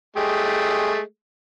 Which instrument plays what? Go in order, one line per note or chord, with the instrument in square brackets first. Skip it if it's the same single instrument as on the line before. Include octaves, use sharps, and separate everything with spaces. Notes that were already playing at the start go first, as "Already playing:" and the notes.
[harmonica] G#3 A3 G4